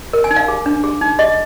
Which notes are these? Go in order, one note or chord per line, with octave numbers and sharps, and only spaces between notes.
A#4
G#5
D#4
F5
G#4
D4
G#4
D#4
G#4 D#5